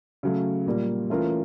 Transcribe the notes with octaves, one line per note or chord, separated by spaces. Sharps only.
C#3 F#3 A3
A#2 G3 A#3
E3 A3 C#4 F4 A#4